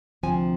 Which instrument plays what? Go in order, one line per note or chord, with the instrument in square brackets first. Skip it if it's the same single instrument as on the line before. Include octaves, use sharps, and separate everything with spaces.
[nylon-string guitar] D2 C3 F3 C4 G#5